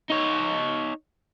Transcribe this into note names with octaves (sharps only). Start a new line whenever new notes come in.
D#4 C#5